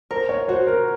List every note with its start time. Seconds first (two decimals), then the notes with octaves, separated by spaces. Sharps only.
0.11 A#4 C5
0.29 C#5
0.48 F#4 C5
0.67 A#4